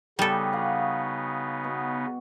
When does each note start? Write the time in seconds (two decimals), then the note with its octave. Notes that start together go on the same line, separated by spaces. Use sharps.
0.19 C#3 G3 B3 D#4 G4 A4
0.52 F#4 F5 F#5
1.64 B2